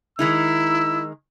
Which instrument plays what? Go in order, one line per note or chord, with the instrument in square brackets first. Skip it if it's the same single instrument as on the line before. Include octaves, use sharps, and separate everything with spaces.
[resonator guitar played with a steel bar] D#3 G#3 D#4 [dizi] E4 [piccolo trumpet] E6